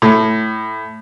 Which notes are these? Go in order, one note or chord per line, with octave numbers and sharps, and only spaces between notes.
A2